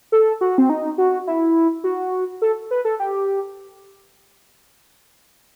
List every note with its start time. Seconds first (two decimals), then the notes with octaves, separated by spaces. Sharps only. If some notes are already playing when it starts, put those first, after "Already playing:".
0.12 A4
0.41 F#4
0.58 C4
0.70 D#4
0.98 F#4
1.27 E4
1.84 F#4
2.42 A4
2.71 B4
2.85 A4
3.00 G4